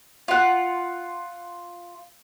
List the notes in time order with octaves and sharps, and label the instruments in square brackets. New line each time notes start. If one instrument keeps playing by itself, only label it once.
[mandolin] F4 F#5